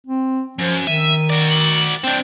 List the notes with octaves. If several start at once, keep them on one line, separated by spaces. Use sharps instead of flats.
C4
F#2 F3
D#3 E5 D#7
F#4 D5
F#7
C4 D4 G5